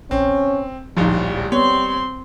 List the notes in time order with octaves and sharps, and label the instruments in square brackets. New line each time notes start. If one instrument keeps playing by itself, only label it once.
[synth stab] A#1 [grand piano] C4 [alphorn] C#4
[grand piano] D1 A#1 [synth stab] F3 D#4 [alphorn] G3
[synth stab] B3 [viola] C4 C6 [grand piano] C#5